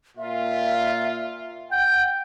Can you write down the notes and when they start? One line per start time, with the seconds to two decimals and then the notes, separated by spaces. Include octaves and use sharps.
0.17 A#2 F4 E5
1.72 F#5 G5 G6